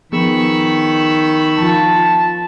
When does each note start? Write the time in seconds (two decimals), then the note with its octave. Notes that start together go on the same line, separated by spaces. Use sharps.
0.12 D#3 F3 B3 G#4 B5 C#6 E6
1.59 F3 F4 A5